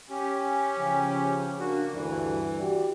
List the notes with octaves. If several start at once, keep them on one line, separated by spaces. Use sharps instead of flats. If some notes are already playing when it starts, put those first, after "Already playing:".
C#4 G4
C#3 F3
A#3 D4 F#4
D2 G2 E3
F#4 G4 D5